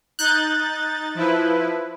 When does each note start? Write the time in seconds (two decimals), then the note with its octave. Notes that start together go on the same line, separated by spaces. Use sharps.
0.19 D#4 F#6 G6 A6
1.15 F3 E4 B4